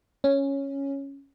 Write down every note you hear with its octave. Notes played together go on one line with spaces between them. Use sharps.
C#4